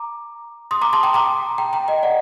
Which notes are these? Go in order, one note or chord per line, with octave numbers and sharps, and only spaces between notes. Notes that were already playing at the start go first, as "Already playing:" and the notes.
Already playing: A#5 D6
C6 D#6
A#5 D6
A5 C6
G5 A#5
A#5 D6
G5 A#5
G5 A#5
D#5 G5
D5 F#5